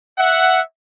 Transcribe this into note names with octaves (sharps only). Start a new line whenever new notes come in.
E5 F#5